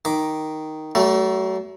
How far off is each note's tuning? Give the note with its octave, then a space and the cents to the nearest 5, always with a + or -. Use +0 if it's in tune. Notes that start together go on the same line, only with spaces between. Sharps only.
D#3 +0 D6 +0
F#3 +40 A3 +0